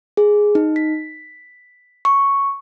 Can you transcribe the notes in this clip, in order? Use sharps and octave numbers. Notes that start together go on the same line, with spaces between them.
G#4
D#4
B6
C#6